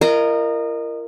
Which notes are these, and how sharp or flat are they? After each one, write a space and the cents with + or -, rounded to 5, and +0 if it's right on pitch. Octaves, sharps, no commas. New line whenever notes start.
F4 -45 A#4 -5 D#5 -25